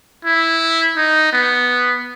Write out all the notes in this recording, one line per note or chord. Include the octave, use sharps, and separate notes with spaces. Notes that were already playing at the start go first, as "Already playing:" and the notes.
E4
D#4
B3